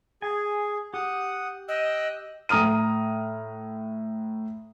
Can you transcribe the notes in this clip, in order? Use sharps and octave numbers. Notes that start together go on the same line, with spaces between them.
G#4 G#5
G4 F#5 D#6
D#5 G5 E6 F#6
A2 A#5 D#6 F6 D#7